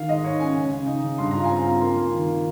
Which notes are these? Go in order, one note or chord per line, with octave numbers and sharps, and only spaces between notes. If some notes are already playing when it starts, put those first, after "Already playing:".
Already playing: D#3 F5
G#2 D#5
G#2 C#5
C#4 G#5
C#3
C#3
D#4
C#3
G2 C6
F4 A#5
G#5
C4
A#5
F4
A#3 C6
A#3
D#3
D#3